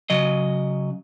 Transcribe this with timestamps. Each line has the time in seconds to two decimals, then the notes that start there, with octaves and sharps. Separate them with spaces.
0.10 C#3 F#3 D#5